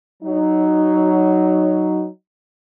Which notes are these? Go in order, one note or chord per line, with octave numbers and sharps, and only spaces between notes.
F#3 D#4